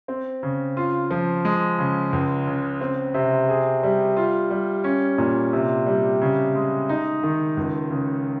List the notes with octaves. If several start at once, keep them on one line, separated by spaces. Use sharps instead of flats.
C4
C#3
F4
F3
G#3
C#3
C#2
C#3
C4
C3
G#4
G3
F4
G3
C#4
A#2
C3
G3
C#3
G#3
D#4
D#3
C#2
C#3